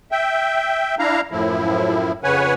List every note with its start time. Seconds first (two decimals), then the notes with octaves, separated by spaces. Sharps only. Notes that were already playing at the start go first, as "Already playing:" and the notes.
0.12 E5 G5
0.99 D4 E4 F5 A#5
1.32 F#2 A2 F3 E4
2.24 F2 C#3 B4 C#5 F#5 G#5